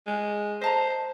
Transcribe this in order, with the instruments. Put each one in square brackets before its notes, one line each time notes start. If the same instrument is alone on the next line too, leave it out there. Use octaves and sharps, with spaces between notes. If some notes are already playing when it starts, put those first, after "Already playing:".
[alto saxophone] G#3
[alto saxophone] C5 [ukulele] D#5 A5 A#5